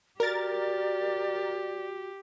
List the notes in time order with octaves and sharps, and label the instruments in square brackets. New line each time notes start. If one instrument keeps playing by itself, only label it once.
[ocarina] F#4 [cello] G4 [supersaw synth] A#4 A6 [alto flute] D5